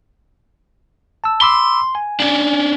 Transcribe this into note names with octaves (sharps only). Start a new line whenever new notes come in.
A5 E6
B5 C6 D6 E6
G#5
C#4 D4